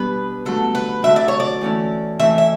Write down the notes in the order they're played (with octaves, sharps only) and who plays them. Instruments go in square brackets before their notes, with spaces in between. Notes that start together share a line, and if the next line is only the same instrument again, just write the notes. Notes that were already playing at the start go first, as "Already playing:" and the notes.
Already playing: [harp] B2 G3 B3 D4 [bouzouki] B4
[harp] D3 F#3 A3 [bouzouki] A4
[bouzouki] B4
[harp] D3 F#3 A3 [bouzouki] E5
[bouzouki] D5
C#5
D5
[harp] E3 A3 C#4 E4
[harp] E3 A3 C#4 E4 [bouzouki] E5
[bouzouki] E5